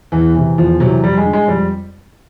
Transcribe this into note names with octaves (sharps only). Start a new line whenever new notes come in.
E2 E3
C3 E3
E2 F3
C3 E3 F#3
F2 G3
G#3
D3
G#3
F2 G3